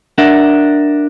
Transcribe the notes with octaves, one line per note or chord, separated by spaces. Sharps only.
D4 A#4 E5 F#5